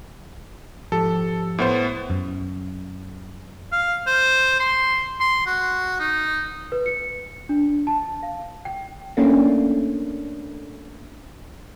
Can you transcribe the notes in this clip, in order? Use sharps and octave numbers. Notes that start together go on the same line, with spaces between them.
G#2 F3 G4 A4
A2 B3 C5
F#2
F5
C5
C6
C6
F#4
D#4
B4
C#7
D4
A5
F5
G5
A3 A#3 C#4 D4